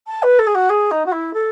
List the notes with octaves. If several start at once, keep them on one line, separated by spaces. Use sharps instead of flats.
A5
B4
A4
G#4
F#4
G#4
D#4
F#4
E4
A4